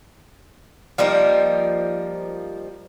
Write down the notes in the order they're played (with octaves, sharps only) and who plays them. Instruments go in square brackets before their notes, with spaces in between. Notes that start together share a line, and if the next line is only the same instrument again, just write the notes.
[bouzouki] F3 G3 A#3 D#4